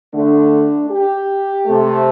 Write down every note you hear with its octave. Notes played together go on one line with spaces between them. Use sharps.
D3 A3 D4
G4
C3 A3